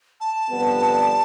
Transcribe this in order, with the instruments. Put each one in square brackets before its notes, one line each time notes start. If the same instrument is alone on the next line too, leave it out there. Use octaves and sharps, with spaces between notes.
[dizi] A5
[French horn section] F2 D3 G3 B3